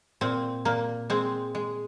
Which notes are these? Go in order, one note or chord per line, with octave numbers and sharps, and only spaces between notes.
A#2 C4
A#2 A#3
G#3 C4
G#3